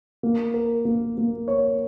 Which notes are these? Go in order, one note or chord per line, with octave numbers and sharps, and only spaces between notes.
A#3
A#4
A#3
A#3
C#5